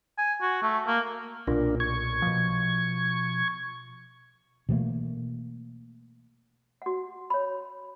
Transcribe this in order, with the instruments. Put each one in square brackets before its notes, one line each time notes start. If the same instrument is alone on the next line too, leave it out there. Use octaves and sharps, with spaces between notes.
[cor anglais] G#5
F#4
A3
A#3
[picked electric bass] B1 A#2 [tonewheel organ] D4 F4 A#4
[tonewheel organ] C#6 G#6
[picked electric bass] B2 F3
[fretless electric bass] B2 E3 A3 A#3
[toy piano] F#4 F#5
C#5 B5